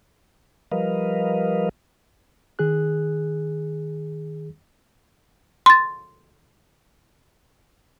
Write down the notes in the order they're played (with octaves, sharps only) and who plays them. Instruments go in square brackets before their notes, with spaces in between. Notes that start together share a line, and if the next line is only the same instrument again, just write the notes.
[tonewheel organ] F3 G3 A#4 B4 D#5 F5
[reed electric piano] D#3 G#4 F#6
[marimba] C6 A6